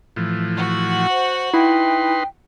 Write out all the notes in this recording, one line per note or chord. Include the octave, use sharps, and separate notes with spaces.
A2 E3 F3
F#4 F#5
C5
D#4 E4 B4 G5 C6